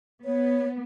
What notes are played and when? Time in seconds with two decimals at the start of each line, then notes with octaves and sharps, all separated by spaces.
0.25 B3 C#5